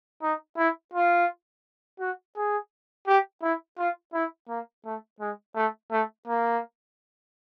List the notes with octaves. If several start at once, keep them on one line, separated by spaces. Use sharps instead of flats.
D#4
E4
F4
F#4
G#4
G4
E4
F4
E4
A#3
A3
G#3
A3
A3
A#3